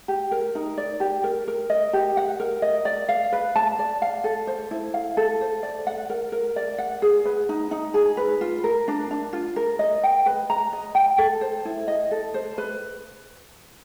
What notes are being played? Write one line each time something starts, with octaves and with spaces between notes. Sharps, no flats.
G4
A#4
D#4
D5
G4
A#4
A#4
D#5
G4
F#5
A#4
D#5
D5
F5
B4
A5
D5
F5
A4
C5
E4
F5
A4
C5
D5
F#5
A#4
A#4
D5
F#5
G#4
B4
D#4
D#4
G#4
B4
F4
A#4
D4
D4
F4
A#4
D#5
G5
B4
A#5
D#5
G5
A4
C5
E4
D#5
A4
C5
B4